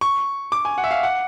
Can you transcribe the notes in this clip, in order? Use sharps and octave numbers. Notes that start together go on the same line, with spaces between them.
C#6
D6
G#5
F#5
E5
F5
F#5